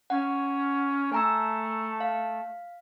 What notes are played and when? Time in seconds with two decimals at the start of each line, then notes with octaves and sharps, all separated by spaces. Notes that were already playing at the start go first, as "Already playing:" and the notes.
0.10 C#4 F#5
1.12 A3 G#5 A#5 E6
2.00 F5